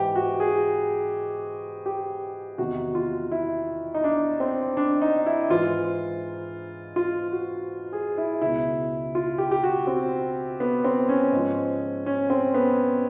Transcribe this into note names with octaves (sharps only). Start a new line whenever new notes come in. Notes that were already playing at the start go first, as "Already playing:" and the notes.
Already playing: G#2 E3 G4
F#4
G#4
G4
E2 C3 D#3 F#4
F4
E4
D#4
D4
C4
D4
D#4
E4
G#2 E3 F4
F4
F#4
G#4
E4
C#2 B2 E4
F4
G4
G4
F#4
C4
B3
C4
C#4
G#2 F3
C#4
C4
B3